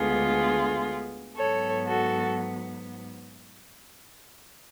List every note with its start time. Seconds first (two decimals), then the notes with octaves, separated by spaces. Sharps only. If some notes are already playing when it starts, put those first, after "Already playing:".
Already playing: D2 D3 G#3 B3 F4 G#4
1.36 G#2 F#3 B3 A4 C#5
1.87 F#4 A4